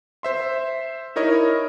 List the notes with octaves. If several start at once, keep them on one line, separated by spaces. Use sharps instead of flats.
C5 E5 C6
D#4 E4 A#4 C#5 D#5